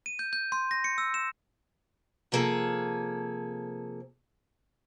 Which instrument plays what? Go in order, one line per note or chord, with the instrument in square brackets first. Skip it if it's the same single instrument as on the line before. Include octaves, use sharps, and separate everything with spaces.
[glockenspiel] D#7
G6
G6
C6
A#6
C#7
E6
E7
[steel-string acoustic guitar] C3 F3 A#3 G#4 A4